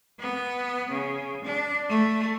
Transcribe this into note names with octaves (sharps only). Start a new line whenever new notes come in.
B3
C#3
D4
A3